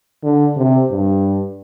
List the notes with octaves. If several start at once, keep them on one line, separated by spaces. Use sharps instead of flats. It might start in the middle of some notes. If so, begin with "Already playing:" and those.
D3
C3
G2